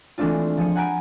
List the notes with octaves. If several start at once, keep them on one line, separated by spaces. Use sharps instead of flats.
E3 G#3 A3 C4 D4 F4
F3 G#4 C#7
F#5 G#5 A#5 B5 G6 D7